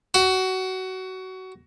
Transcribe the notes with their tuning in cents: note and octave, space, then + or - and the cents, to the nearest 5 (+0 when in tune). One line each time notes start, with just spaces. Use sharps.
F#4 +20